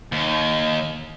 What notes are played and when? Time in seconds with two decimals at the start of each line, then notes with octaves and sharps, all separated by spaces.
0.12 D#2